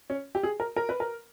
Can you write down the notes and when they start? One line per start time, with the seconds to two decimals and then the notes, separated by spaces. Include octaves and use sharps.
0.10 C#4
0.35 G4
0.43 G#4
0.60 A#4
0.76 A#4
0.89 B4
1.00 A#4